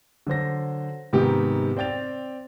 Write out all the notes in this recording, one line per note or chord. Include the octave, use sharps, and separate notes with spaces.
D3 F#3 C5 A#6
G#2 C3 D#3 B3 G4
C4 D5 G5 A6 F7